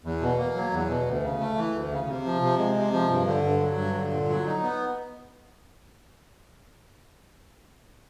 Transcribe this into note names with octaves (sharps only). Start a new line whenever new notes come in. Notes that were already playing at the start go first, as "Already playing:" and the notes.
E2
B2
A#3
F#3
E2
B2
D2
C#3
A3
E3
D2
C#3
C3
F3
C3
G#3
C3
F3
G2
D3
G2
F#3
G2
D3
A#2
F#3
D#4
B3